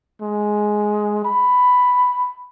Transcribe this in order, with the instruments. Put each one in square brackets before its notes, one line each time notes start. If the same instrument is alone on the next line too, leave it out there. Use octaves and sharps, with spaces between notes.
[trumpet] G#3
B5